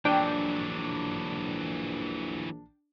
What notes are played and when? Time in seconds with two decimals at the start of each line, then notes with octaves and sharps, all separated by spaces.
0.05 A#1 E3 F#3 D4 G5